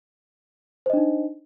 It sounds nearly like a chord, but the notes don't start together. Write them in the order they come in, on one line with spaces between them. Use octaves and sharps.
C5 D#5 D4 D#4